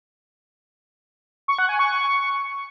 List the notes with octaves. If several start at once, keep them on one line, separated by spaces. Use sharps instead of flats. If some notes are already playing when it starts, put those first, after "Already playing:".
C#6
F#5
G#5
C#6